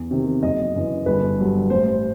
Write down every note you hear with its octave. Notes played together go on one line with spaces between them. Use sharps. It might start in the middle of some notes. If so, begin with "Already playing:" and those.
Already playing: E2
C3 D#3
F#1 D#5
F#2 E3
G1 B4
G2 F#3
A1 C5